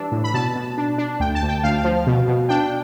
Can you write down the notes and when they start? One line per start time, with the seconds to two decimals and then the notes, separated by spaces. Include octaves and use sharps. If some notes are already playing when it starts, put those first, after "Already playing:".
Already playing: E3 G3 D4 E6
0.12 A2
0.24 B5
0.34 B2 A5
0.55 B2
0.78 D4
0.98 D4
1.20 D2 G5
1.35 A5
1.42 D2
1.49 G5
1.64 D2 F5
1.84 F3
2.07 B2
2.28 B2
2.49 D4 G5